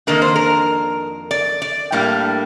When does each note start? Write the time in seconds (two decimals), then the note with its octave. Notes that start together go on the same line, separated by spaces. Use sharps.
0.07 F2 D#3 A#3 D4 A#4
0.22 C5
0.36 A#4
1.31 D5
1.62 D5
1.92 A2 G3 A#3 D4